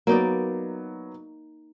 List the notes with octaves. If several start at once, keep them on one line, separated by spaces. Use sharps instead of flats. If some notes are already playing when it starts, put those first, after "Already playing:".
F#3 A#3 B3 D#4 D5